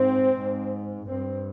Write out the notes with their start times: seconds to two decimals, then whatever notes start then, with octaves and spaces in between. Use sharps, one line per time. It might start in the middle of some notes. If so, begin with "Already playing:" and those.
Already playing: G#2 C4
0.37 G#2
1.08 G2 C4